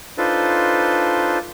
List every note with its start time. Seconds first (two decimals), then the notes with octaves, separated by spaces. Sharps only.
0.18 D4 D#4 F4 A4 B4 C5